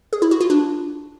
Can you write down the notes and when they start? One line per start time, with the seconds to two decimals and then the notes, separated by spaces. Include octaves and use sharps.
0.13 G#4
0.22 E4
0.31 F#4
0.41 F4
0.50 D4